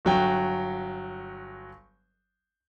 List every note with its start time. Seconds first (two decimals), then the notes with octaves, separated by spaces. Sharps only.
0.05 G1 F#3 G5